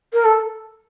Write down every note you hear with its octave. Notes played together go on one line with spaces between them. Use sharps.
A#4
A4